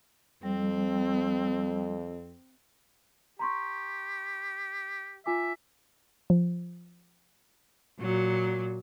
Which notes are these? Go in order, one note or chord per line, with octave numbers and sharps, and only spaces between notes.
F2 G3 C4
G4 A#5 C6 C#6
F4 E5 G#5 D6
F3
A#2 F#3